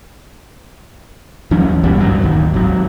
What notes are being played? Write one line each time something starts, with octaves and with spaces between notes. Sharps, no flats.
D#2 E3 F#3 C#4
C#2 F#2 B2 G3
G#1 G2 F3 F#3
D1 D#2 D#3
G#1 F#3